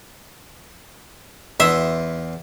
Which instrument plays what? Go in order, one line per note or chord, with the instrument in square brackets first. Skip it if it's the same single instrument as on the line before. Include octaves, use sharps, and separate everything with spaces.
[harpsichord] E2 C6 D#6 [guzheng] E5